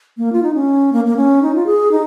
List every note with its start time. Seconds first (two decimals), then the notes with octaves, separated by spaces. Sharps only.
0.18 A#3
0.33 F4
0.43 D#4
0.54 C#4
0.93 A#3
1.06 A#3
1.17 C#4
1.42 D#4
1.55 F4
1.66 G#4
1.91 D#4